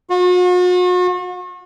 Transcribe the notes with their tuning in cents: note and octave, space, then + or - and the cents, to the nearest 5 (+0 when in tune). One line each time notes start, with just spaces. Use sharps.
F#4 -45